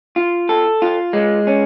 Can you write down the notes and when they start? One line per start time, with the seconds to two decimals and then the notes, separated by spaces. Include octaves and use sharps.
0.16 F4
0.49 A4
0.82 F4
1.13 G#3
1.47 C#4